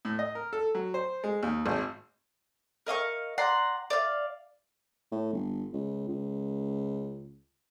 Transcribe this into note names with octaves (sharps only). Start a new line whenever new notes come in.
A2
D#5
A#4
A4
F#3
C5
G#3
D#2
G#1
A#4 D#5 F5 C#6
D5 F#5 A#5 C6
D5 F5
A2
G1
C#2
C#2